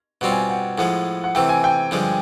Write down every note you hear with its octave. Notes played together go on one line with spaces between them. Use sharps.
B2 G3 C4 F4 F#5
G#5
G5
F#5
A2 F3 G#3 F#5
F#5
C3 E3 A3 G5
G#5
G5
G2 D3 F3 G#3